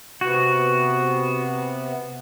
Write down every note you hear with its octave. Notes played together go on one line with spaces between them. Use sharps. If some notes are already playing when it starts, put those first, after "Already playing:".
C3 B3 F#4